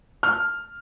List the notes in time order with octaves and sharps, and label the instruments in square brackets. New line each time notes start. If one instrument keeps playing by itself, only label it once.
[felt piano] F6